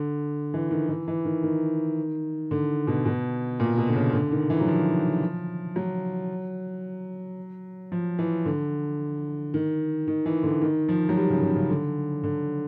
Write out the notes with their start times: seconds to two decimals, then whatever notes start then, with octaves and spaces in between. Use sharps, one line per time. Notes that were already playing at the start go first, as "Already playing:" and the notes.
Already playing: D3
0.54 E3
0.71 D#3
0.89 E3
1.08 E3
1.25 D#3
1.43 D#3
2.51 D3
2.87 B2
3.05 B2
3.60 A#2
3.78 B2
3.88 D3
3.96 C#3
4.13 D3
4.32 D#3
4.50 E3
4.60 F#3
4.67 F3
5.76 F#3
7.92 F3
8.19 E3
8.45 D3
9.54 D#3
10.08 D#3
10.26 E3
10.43 D3
10.62 D#3
10.88 F3
11.09 F#3
11.16 G3
11.30 C#3
11.42 C#3
11.56 C#3
11.70 D3
12.24 D3